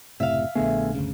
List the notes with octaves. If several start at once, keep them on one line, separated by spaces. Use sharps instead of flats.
F#1 A2 C3 E5 F5
A#1 D3 A3 B3 G#4
G1 D2 C#3